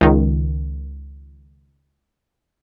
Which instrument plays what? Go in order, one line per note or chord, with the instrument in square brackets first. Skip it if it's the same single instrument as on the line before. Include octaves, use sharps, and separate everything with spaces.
[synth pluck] C#2 D#3